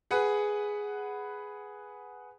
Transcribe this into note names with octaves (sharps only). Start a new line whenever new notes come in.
G#4 B4 F#5